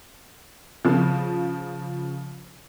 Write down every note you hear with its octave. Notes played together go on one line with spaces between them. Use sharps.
C#3 F3